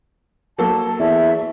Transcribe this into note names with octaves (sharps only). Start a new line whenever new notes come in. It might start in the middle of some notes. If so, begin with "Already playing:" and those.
F#3 A#3 A4 A5
E2 E5